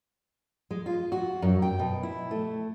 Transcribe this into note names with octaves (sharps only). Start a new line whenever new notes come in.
G#3
F4
F#4
F#2
G5
B2
E4
A3